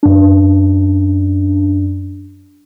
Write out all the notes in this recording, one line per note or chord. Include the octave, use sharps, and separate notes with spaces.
F#2 D4